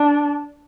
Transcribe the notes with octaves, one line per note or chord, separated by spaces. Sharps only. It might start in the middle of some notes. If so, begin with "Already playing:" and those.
Already playing: D4